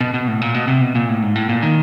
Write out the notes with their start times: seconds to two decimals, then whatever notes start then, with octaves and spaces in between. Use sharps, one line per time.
0.01 B2
0.14 B2
0.28 A2
0.42 A#2
0.54 B2
0.68 C3
0.81 B2
0.95 A#2
1.09 A2
1.22 G#2
1.35 A2
1.49 A#2
1.63 D#3